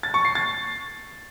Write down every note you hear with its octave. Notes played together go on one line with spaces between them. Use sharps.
A6
C#6
C7
A6